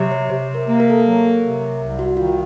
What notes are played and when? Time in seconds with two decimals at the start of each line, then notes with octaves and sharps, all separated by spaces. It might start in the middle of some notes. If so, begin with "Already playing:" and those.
Already playing: C3 F#3
0.11 C#5
0.30 C3 C5
0.55 A#4
0.68 A#3
0.80 A#4
0.90 A4
1.00 A#4
1.05 F#3
1.43 C3
1.80 C2
1.99 F#4
2.17 D#3 F4